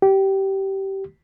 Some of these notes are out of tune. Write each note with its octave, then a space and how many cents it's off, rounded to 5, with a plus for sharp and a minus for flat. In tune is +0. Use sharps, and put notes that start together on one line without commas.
G4 -20